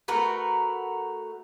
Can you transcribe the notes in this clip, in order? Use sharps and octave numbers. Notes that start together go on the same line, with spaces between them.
A3 F#4 A#4 B4